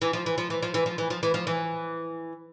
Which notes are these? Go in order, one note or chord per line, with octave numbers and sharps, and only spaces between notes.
E3
F3
E3
F3
E3
F3
E3
F3
E3
F3
E3
F3
E3